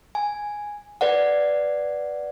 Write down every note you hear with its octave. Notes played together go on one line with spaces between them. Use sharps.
G#5
B4 D5 F#5